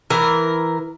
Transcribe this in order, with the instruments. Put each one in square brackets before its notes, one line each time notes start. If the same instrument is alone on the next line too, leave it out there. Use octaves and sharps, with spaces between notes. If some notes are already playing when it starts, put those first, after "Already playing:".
[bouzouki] E3 A#4